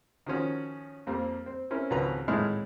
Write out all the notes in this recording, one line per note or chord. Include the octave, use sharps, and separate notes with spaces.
D#3 F3 C#4 F#4
F2 G3 A#3 C4
C4
C4 C#4 E4 A#4
G#1 C#2 F3 F#4 B4 A#5
G#1 A2 G#3 D#4 E4 F6